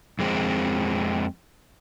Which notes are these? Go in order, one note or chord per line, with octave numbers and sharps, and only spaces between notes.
F2 G#3 C4